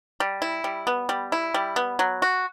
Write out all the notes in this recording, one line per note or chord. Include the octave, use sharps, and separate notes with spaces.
G3
E4
G3
B3
G3
E4
G3
B3
F#3
F#4